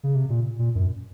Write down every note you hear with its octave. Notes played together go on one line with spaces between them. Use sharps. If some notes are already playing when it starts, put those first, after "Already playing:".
C#3
C3
A#2
A#2
F#2